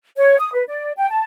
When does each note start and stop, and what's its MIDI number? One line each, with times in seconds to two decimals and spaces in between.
0.17 0.37 73
0.38 0.51 87
0.52 0.63 71
0.68 0.92 74
0.97 1.08 79
1.09 1.24 81